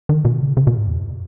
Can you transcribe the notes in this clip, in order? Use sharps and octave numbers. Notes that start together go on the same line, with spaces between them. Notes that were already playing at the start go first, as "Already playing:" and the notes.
D#3
B2
C#3
C#3
B2
G#2
E2
F#2